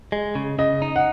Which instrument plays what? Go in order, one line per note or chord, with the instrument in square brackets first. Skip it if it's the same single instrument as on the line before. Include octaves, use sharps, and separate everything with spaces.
[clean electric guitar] G#3
C#3
[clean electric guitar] C#3 [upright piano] D#5
[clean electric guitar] D#4
[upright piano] F#5